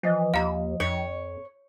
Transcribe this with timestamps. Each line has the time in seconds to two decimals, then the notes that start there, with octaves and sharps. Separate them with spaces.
0.03 E3 F3 D#5
0.34 D#2 F5 A#5
0.80 F2 C#5